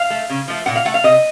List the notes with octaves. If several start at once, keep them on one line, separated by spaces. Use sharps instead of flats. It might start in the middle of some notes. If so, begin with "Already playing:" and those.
Already playing: F5
A3
C#3
F3 A3
A#2 F#5
F5
A3 F#5
F5
C3 D#5